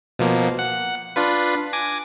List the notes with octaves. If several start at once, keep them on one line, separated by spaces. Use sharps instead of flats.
B2 F3 A#3
F#5
D4 F4 B4
G#5 D6 A#6